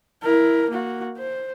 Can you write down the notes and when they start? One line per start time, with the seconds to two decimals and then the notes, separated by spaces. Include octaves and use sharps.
0.23 E4 A#4
0.69 A#3 F#4
1.18 C5